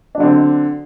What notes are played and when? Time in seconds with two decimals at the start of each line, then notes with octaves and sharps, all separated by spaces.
0.15 D4
0.18 F#3
0.20 D3
0.23 C4